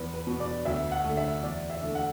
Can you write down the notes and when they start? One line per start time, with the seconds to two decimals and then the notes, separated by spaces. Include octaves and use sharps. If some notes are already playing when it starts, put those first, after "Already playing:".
Already playing: E2 B4
0.14 B4
0.27 B2 B3
0.40 D5
0.65 D2 E5
0.92 F#5
1.04 D3 A3
1.17 E5
1.43 E2 D5
1.70 E5
1.82 D3 A3
1.95 F#5